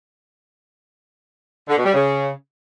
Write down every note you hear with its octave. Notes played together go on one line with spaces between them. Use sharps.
D3
B2
G3
C#3